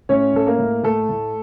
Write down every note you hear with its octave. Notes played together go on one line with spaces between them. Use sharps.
A2 C#4 C#5
A2 A4
A#3 A#4
A2
A2 A3 A4
A2